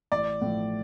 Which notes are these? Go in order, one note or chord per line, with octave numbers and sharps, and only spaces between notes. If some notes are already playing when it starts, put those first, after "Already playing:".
A1 D5
A2 F3